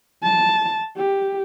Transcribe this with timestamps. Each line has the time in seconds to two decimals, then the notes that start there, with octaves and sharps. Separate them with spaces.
0.23 A5
0.96 G4